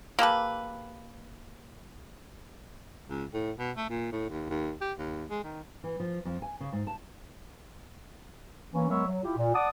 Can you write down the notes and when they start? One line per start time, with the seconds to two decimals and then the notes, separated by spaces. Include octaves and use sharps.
0.19 A#3 G4 A4 B4
3.07 C#2
3.34 A2
3.59 B2
3.77 A3
3.90 A#2
4.12 A2
4.29 D#2
4.50 D#2
4.81 G4
4.98 D#2
5.30 G#3
5.44 D#3
5.84 E3
6.00 F3
6.25 F2
6.42 G#5
6.60 C#3
6.72 G#2
6.87 A5
8.74 E3 A#3 C#4
8.89 F#3 G#3 B3 A#4 C#5 E5
9.06 F#3
9.24 E4 F4 G4
9.36 A#2
9.54 D5 F#5 A5 D6 D#6